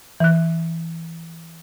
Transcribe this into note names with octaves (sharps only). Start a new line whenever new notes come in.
E3 F#6